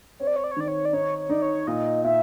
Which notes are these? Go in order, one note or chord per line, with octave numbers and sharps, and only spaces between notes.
C4 C#5
D5
C#5
D5
C#5
D#3 D5
C#5
D5
D#4 C#5
C#5
D#4 D5
C#5
A#2 D#5
A#2 E5